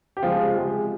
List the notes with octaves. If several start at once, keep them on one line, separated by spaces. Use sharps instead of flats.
G4
C#3 F3 G#3 F4
C3 F3 G#3